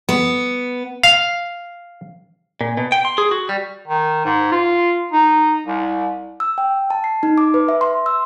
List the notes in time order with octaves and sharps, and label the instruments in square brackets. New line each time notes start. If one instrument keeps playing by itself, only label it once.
[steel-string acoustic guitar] B3
[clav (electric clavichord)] F5
[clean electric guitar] A#2
B2
G5
C6
G#4
F#4
G3
[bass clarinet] D#3
G#2
F4
D#4
C2
[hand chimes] E6
G5
A5
C7
D#4
D6
B4
E5
C6
E6